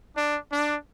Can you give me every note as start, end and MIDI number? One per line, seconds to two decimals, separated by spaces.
0.16 0.39 62
0.52 0.76 62